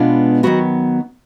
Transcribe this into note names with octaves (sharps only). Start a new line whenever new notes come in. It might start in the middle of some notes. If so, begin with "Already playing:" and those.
Already playing: B2 G#3 B3 D4 F4
D#3 F#3 B3 F#4